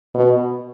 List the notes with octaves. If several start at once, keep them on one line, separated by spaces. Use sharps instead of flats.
B2